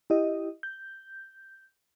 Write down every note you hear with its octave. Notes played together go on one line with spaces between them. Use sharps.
E4 G4 D#5
G6